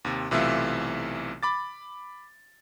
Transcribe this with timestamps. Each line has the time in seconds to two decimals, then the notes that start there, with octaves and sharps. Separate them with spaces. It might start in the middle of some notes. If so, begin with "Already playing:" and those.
0.05 D#2 C3
0.31 B1 C3 E3 A3 F4 E5
1.43 B5 D6 A6